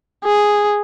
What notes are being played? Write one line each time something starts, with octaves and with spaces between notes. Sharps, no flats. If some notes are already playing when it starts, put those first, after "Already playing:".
G#4